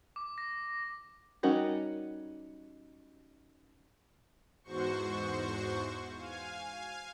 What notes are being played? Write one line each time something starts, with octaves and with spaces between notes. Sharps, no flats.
D6
A#6
G3 C#4 D#4 F#4 A#4
E2 G#2 F#4 C5 C#6
F5 G#5